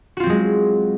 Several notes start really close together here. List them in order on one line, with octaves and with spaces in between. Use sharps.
F#4 F4 C4 F#3 G#3